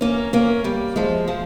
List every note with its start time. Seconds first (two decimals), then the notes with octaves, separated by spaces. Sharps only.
0.01 A#3 C#4
0.33 A#3 C#4
0.64 G3 A#3
0.96 F3 G#3
1.28 F3 G#3